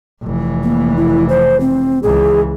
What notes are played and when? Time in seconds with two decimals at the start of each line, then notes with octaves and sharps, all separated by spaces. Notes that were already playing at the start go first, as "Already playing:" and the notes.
0.22 F1 E3
0.63 A#3
0.97 E4
1.29 C5
1.60 C4
2.03 C#2 E3 G#4